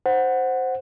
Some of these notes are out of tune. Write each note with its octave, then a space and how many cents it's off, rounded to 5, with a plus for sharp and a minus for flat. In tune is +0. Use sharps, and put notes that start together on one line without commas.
C5 +0 F#5 +0